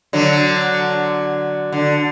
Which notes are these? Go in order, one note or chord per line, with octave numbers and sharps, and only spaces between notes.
D3 F#3
D3